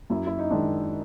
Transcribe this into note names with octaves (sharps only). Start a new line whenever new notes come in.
F#2 E4
E4
D#4
D#3 G#3 D4